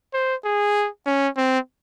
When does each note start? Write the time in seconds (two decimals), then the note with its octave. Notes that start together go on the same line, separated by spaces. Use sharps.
0.14 C5
0.44 G#4
1.06 C#4
1.37 C4